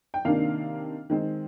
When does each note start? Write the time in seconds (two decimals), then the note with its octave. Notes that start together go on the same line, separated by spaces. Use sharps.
0.14 G5
0.25 C3 D#3 A#3 D4 F5
1.10 D#3 G#3 C4